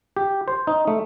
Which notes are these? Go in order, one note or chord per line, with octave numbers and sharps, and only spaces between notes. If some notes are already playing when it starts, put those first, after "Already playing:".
G4
C5
D#4
A3